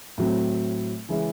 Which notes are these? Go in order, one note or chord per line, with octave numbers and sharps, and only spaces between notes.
A2 F#3 C4
C#3 E3 G#3 C#4 E4